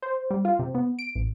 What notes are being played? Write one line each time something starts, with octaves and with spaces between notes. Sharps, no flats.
C5
G3
F4
C3
B3
D7
A1